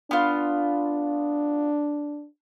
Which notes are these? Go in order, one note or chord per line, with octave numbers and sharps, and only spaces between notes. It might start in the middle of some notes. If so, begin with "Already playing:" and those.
B3 D4 F4